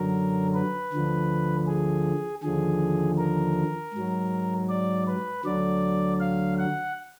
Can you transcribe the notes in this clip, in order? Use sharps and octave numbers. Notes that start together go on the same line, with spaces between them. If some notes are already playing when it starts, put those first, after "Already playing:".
Already playing: F#2 D3 F#3 A#4
B4
D2 D3 F3
G#4
D#2 D3 F3 G#4
A#4
G#2 F#3
D5
B4
D2 D3 F#3 D5
F5
F#5